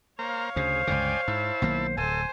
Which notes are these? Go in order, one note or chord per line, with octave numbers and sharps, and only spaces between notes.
A#3 C5 C#5 F5 A#5
D2 C#3 G#4 C5
C#2 G2 D3 D5 G5 G#5
G#2 E4 A5
B1 D#3 A#3
D1 A4 C5 G#5